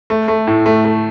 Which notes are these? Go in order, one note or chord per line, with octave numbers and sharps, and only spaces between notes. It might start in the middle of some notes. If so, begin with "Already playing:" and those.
A3
A3
A2
A3
A3